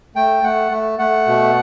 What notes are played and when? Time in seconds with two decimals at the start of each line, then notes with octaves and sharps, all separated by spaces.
0.16 A3 G5
0.43 A3 F#5
0.71 A3
0.99 A3 F#5
1.27 B2